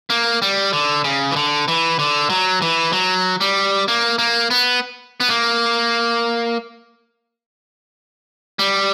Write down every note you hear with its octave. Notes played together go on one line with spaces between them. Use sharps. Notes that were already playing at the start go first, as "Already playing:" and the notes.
A#3
G3
D3
C#3
E3
D3
E3
D3
F#3
E3
F#3
G3
A#3
A#3
B3
B3
A#3
G3